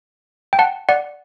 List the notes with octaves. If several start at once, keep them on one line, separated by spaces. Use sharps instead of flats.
G5
F#5 A5
D5 F#5